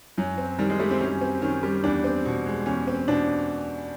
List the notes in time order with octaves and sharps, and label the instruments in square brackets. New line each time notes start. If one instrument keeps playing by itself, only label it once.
[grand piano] F#2 [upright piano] F#3
[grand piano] C4
[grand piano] D#3 [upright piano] G3
[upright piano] G#3
[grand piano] G3 [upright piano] A3
[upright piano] C4
[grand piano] F#2 [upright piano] C#4
[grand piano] C4
[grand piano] D#3 [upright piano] C#4
[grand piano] G3
[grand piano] E2 [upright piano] D4
[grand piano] C4
B2
G#3
[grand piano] E2 [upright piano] C#4
[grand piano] C4
[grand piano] B2 [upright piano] D4